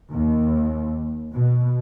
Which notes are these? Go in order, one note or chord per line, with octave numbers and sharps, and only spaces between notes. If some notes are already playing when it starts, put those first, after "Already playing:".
D#2
B2